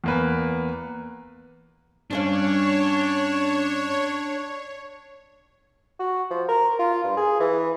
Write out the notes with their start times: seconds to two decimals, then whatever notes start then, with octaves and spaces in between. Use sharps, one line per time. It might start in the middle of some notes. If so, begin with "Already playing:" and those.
0.04 E2 A#3 B4
2.11 G2 C#4 D4 C#5 F5
6.00 F#4
6.31 F3
6.49 A#4
6.79 F4
7.04 G2
7.17 G#4
7.40 E3